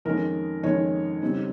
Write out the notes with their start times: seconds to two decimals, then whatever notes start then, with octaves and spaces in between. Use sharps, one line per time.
0.05 F2 D#3 G#3 C#4 A#4
0.63 F2 D#3 G#3 C#4 C#5
1.22 C#3 G3 C4 D#4